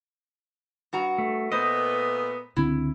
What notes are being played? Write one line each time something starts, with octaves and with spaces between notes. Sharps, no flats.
G2 F#4 A#5
A3
A#2 A3 B3 C5 D#5
C#2 D3 C4 E4